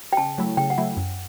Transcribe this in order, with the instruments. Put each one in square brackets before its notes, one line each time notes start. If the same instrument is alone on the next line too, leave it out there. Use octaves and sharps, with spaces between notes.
[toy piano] G5
[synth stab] C#3 [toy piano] A5
[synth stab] F#3 A3 E4
[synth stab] C#3 [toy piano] G5
[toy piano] F#5
[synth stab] F#3 A3 E4
F#2